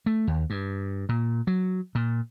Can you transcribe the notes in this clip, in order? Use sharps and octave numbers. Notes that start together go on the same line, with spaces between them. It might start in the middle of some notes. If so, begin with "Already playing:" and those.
A3
D#2
G2
A#2
F#3
A#2